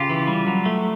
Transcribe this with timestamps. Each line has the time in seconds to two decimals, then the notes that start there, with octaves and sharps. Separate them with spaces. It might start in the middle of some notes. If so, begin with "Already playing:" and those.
Already playing: C#3 F4 G4
0.09 E3
0.27 G3
0.47 F#3
0.66 A3